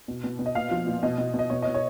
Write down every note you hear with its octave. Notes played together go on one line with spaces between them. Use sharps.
B2
B2
B2
D#5
A#2 F5
F3
A#2
B2 D#5
B2
B2 D#5
B2 C#5
B2 D#5
C#5